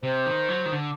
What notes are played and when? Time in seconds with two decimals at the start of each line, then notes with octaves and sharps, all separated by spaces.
0.03 C3 C5
0.26 D#3
0.49 F#3
0.65 D#3
0.72 D3